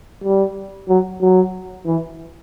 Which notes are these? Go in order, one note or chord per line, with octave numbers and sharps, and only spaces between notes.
G3
F#3
F#3
E3